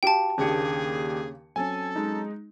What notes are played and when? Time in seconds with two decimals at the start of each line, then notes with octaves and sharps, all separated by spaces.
0.03 F#4 G4 F5 G5 A5
0.38 D#2 C#3 A#3 D4 G4 G#4 C#7
1.56 F#3 C4 C#4 A4 G#5
1.96 G#3 D#4